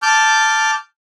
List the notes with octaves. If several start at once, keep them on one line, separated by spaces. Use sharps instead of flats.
A5 D6 F6 G6